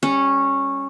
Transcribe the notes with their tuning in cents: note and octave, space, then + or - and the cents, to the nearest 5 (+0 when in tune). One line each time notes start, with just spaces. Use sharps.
G3 +25 C#4 -10